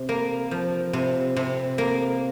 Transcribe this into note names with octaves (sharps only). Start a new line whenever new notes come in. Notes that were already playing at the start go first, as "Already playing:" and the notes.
Already playing: C3
A#3
F3
C3
C3
A#3